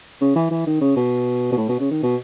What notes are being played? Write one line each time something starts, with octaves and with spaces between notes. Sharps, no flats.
C#3
E3
E3
D#3
C#3
B2
B2
A2
B2
C#3
D#3
B2